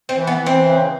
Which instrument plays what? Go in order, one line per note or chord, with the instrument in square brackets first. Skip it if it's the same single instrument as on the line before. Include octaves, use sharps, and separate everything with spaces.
[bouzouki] C4
[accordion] E3
[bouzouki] B3
[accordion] E3
[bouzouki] C4
[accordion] C#3